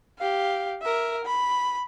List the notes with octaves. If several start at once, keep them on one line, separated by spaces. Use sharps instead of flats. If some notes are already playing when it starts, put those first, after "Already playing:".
G4 F5
A#4 E5
B5